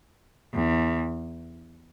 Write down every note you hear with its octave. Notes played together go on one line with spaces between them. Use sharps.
E2